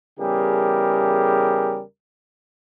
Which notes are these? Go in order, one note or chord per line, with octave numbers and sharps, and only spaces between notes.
E2 C#3 G3 G4 G#4 A#4